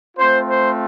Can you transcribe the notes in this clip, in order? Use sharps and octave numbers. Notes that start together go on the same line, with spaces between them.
A3 C4 F4 C5
C5